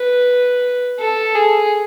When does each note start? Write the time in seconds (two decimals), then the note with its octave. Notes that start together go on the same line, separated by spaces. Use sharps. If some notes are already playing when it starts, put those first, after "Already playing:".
Already playing: B4
1.00 A4
1.36 G#4